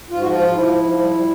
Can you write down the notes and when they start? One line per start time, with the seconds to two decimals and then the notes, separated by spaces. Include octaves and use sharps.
0.10 G#2 F4
0.20 F#4
0.25 F3 F4
0.41 G#2
0.55 F3 E4
0.70 G#2
0.84 F3
0.99 G3
1.14 G3